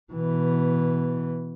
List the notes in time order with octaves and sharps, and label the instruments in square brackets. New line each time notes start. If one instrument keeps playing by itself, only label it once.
[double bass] B2 E3